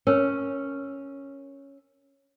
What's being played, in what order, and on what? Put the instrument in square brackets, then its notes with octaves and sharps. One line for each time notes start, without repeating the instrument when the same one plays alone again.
[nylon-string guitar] C#4 [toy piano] A#4 C#5